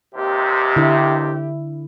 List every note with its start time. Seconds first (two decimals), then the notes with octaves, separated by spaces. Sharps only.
0.15 D#2 C3 G4
0.76 D3 E4